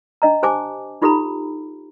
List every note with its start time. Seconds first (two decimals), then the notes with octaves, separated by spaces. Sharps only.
0.22 D4 D#5 A#5
0.43 G4 C5 G#5 A5 D6
1.02 D#4 F4 G4 A4 A#5 B5